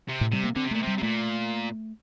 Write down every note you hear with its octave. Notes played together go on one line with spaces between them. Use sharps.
C3
A2
C3 G3
A#3
D3 C4
C3
A#2 A3
C3 G3
C3
A#2 A3